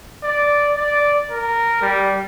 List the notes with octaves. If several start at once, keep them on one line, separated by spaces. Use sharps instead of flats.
D5
D5
A#4
G3